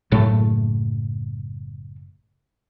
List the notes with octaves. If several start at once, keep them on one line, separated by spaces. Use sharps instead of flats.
F#1 A2 A3